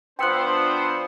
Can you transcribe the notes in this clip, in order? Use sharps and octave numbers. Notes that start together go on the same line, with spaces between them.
F3 B3 D4 C5 G5 C6 E6 F#6